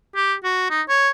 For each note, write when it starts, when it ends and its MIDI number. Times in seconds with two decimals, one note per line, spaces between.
0.15 0.35 67
0.44 0.67 66
0.70 0.82 63
0.89 1.10 73